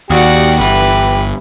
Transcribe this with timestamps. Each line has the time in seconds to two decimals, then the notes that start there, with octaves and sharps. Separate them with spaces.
0.10 D#2 F#4 G4 D5 F#5
0.60 G1 E3 B4